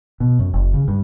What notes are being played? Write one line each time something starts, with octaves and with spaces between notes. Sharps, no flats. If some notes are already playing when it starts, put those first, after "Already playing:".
B2
F#2
F#1
C#3
G2